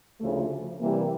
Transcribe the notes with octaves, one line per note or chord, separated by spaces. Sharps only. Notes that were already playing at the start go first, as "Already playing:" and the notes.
D2 C#3 F3 A3
C3 E3 G3 A#3